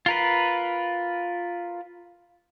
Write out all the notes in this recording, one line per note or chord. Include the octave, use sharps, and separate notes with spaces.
F4 A#4 B4